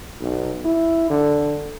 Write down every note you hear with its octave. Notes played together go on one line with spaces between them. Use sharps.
B1
E4
D3